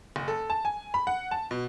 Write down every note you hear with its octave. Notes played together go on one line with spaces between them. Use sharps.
F#1
A4
A5
G#5
B5
F#5
A5
B2